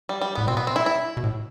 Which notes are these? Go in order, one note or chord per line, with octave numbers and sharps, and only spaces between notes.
G3
G3
A2 B3
B2 C4
B3
C4
E4
E4
B2
A2